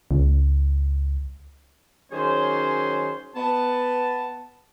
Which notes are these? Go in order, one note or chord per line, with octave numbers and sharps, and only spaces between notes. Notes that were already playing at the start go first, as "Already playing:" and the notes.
C#2
D#3 F#3 C#4 G#4 C5
B3 A5